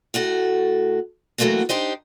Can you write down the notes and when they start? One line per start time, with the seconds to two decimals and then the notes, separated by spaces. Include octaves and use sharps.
0.14 A2 A3 F#4 A4
1.38 E3 F#3 A3 A#3 C4 F#4
1.69 D4 D#4 G4 C5 D#5